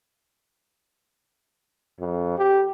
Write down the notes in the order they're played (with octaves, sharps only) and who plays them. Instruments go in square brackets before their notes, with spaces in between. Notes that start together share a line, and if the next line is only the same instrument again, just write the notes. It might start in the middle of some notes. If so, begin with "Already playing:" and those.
[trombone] F2
G4